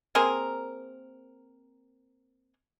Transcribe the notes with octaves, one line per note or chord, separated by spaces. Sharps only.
A#3 C4 G#4 A#4